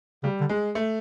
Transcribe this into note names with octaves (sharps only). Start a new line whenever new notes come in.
C#3 G3
D3
G#3
A3